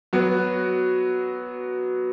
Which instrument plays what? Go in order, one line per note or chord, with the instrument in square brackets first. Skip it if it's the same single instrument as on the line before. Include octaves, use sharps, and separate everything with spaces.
[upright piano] F#3 B3 F#4